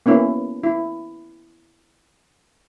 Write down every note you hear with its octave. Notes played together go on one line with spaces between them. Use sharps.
A#3 B3 C#4 E4
E4